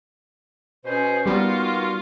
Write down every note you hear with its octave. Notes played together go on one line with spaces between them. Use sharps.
B2 C#4 G#4 C5
G3 A#3 B3 D#4 F4 F#4